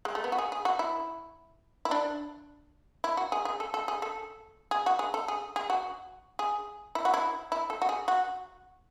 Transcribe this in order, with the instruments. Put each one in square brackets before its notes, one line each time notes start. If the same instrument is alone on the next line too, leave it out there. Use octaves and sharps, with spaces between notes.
[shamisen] G#3
A3
B3
F#4
G#4
G#4
F#4
E4
E4
D4
E4
F#4
G#4
G#4
A4
A4
G#4
A4
G#4
F#4
G#4
A4
G#4
G#4
F#4
G#4
E4
F#4
E4
E4
A4
F#4
G#4
F#4